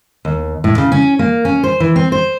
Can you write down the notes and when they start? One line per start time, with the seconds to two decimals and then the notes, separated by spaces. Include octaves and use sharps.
0.25 D#2
0.64 A2
0.78 C#3
0.92 C#4
1.19 A#3
1.45 C#4
1.64 C5
1.80 E3
1.96 C4
2.12 C5